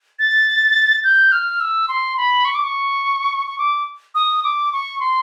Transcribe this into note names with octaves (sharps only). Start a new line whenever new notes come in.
A6
G6
F6
E6
C6
B5
C#6
D6
C#6
C#6
D6
D#6
D6
C#6
C6